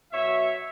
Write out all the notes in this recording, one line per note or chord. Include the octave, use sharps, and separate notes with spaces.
B2 F#3 C#5 E5